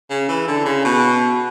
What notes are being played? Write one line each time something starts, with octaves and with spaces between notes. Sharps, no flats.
C#3
E3
D3
C#3
B2